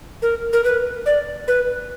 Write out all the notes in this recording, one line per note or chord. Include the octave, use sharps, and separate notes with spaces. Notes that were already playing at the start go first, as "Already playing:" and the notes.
A#4
A#4
B4
D5
B4